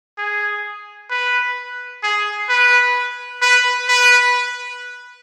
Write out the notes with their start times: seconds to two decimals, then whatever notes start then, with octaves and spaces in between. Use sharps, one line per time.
0.18 G#4
1.11 B4
2.03 G#4
2.49 B4
3.42 B4
3.88 B4